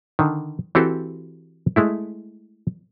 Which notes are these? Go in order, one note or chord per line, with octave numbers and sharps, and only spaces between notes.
D3 D#3
E3 C4 F#4 G4 A4 C5
G#3 A3 E4